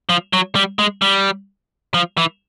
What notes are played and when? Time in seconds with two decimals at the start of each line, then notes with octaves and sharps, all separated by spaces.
0.09 F3
0.33 F#3
0.55 G3
0.79 G#3
1.02 G3
1.94 F3
2.18 E3